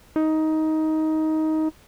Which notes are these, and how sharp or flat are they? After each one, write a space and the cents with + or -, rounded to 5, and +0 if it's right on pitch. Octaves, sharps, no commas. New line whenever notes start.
D#4 +15